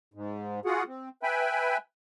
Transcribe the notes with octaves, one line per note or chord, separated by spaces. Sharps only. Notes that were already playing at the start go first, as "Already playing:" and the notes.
G#2
F4 F#4 G#4 F#5
C4
B4 E5 G5 G#5 B5